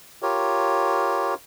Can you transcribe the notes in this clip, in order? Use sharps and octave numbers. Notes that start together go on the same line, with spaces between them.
F4 G4 A#4 C#5